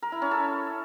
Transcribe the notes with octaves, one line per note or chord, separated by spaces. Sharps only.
A#4
E4
C#4
A4